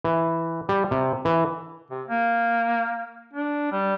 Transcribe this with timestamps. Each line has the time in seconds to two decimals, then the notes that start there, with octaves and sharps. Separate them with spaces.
0.04 E3
0.69 G3
0.91 C3
1.25 E3
1.91 C3
2.08 A#3
3.33 D4
3.72 G3